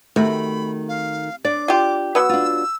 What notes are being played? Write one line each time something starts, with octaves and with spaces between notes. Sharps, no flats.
C3 D#3 A3 F#4 B5
F5
D4 D5 D6
F4 G4
F#3 B3 E6
D4 F4